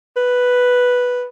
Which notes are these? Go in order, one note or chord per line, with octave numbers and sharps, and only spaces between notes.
B4